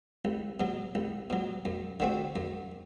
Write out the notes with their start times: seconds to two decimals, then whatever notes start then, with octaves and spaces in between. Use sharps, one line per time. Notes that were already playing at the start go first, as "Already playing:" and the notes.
0.25 C2
0.60 B2 F#3
0.95 C2
1.30 B2 F#3
1.65 F#2
2.00 D3 A3 C4 F#4
2.36 F#2